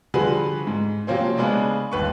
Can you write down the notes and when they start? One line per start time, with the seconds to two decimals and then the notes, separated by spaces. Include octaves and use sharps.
0.14 D3 F3 G3 F#4 G#4 B4
0.67 G#2
1.07 C3 F3 F#3 A#3 C4 C#4
1.37 C#3 G#3 B3 D4
1.92 G1 D#2 B4 C#6